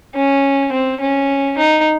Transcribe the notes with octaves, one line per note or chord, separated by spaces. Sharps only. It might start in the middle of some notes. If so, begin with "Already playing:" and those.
C#4
C4
C#4
D#4